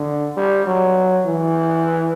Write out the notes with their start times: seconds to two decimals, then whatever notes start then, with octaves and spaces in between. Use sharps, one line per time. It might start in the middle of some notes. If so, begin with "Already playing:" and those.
Already playing: D3
0.37 G3
0.66 F#3
1.26 E3